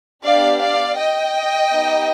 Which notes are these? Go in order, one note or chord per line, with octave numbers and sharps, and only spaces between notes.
B3 D4 G4 D5 F5
D5 F5
D#5 G5
B3 D#4 G4